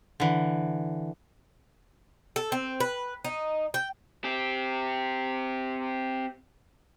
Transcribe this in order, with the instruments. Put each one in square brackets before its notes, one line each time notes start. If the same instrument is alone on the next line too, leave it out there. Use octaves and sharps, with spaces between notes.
[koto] D3 E3
[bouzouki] A4
C4
B4
D#4
G5
[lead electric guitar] C4 G4